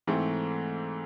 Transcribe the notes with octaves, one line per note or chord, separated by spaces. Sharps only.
G#2 E3 A3 C4